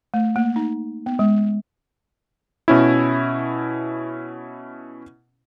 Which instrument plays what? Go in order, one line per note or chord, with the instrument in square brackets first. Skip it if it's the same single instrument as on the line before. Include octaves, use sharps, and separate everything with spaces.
[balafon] A3
A#3
D#4
B3
G#3
[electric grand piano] B2 C#4 E4